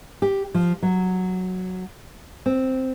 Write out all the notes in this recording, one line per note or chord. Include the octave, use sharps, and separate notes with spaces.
G4
F3
F#3
C4